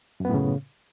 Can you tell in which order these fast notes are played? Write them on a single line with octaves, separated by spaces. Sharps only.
F#2 B3 A2 C#3